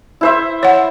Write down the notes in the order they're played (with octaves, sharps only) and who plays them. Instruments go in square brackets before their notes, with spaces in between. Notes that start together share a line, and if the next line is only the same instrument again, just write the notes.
[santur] E4 C5 E5
[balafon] C#5 F#5